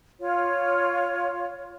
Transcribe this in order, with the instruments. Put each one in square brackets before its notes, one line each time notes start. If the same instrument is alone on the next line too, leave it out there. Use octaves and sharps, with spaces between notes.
[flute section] F4 C#5